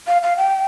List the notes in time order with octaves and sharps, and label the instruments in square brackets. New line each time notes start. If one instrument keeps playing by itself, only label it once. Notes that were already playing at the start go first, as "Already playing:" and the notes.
[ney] F5
F5
G5